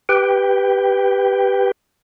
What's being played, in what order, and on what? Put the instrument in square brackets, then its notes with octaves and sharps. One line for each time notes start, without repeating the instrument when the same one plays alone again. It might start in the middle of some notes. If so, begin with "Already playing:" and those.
[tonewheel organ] G4 B4 G5